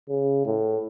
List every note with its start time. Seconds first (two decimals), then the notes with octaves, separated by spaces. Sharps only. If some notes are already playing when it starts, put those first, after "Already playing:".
0.09 C#3
0.45 A2